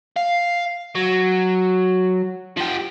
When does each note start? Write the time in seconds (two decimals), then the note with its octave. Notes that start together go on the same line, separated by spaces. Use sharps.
0.16 F5
0.95 F#3
2.57 F3 G4